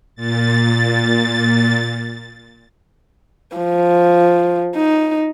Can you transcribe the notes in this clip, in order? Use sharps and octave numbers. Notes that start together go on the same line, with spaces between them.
A#2 A6
F3
D#4